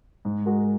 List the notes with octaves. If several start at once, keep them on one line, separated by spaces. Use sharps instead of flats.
G#2
G#3 F#4 A#4